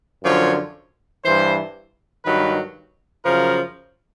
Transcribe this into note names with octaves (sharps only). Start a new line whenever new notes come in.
F#2 D3 F3 C#5
G2 E3 C5
G2 D#3 F#3 B4
F#2 C#3 F3 A#4